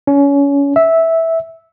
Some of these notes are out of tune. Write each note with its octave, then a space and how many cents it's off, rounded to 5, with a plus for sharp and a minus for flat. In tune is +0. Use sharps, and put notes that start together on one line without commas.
C#4 +25
E5 -10